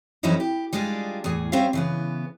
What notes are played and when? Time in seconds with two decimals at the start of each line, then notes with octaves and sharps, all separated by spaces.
0.23 F2 E3 F#3 C#4 D#4 E4
0.40 G4
0.73 G3 G#3 D4 F4 G#4
1.24 E2 A2 G#4
1.52 G3 C4 C#4 C5 E5 F5
1.73 C#3 E3 B3